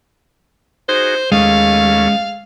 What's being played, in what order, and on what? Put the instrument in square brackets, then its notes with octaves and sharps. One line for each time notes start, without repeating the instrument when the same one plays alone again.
[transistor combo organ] D#4 F#4 G#4 [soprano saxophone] C5
[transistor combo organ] D#2 A3 C#4 [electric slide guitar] G#3 [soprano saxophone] F5